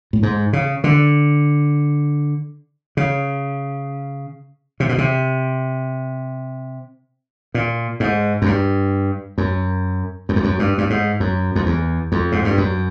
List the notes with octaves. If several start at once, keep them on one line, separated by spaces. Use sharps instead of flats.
A2
G#2
C#3
D3
C#3
C3
B2
C3
A#2
G#2
F#2
G2
F#2
F#2
F2
F#2
G2
G2
G#2
F#2
F2
E2
F2
G#2
G2
F#2